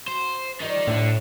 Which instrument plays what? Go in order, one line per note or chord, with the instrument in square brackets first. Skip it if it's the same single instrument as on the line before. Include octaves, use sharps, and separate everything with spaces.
[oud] F#4 [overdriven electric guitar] C5
[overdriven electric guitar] D#3 D#4 [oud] F3 G3 D5
[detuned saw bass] A2 [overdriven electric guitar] D3